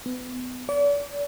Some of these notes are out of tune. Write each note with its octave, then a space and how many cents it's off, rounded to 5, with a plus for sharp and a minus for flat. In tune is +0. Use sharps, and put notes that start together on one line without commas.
B3 +30
D5 -40